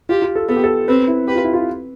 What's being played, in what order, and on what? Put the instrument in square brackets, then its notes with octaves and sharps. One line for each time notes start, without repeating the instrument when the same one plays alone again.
[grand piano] F4 [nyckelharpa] G4
[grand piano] F4
A4
[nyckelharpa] B3 [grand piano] A4
[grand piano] G4
A4
[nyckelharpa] C4 [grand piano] B4
[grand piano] E4
[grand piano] G4 [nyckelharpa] B4
[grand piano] F4
E4
F4